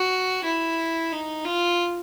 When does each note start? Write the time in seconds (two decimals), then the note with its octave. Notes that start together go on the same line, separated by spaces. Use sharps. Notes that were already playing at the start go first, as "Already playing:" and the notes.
Already playing: F#4
0.44 E4
1.12 D#4
1.45 F4